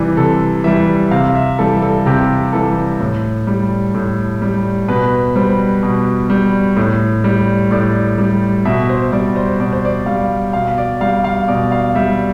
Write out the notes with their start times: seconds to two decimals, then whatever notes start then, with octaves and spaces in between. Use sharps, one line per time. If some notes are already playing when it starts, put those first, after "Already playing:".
Already playing: C3 E3 G3 D5
0.17 C3 A4
0.64 E3 G3 E5
1.11 C3 F5
1.35 E5
1.59 E3 G3 A4
1.82 A4
2.06 C3 G4
2.53 E3 G3 A4
3.00 A2
3.47 G3
3.94 A2
4.42 G3
4.88 B2 B4
5.36 G3 C5
5.83 B2
6.30 G3
6.77 A2
7.24 G3
7.71 A2 D5
8.18 G3
8.65 B2 E5
8.89 C5
9.12 G3 D5
9.36 C5
9.60 B2 D5
9.73 C5
9.85 D5
10.06 G3 F5
10.53 B2 F5
10.78 D5
11.01 G3 F5
11.24 F5
11.48 B2 D5
11.72 F5
11.95 G3 E5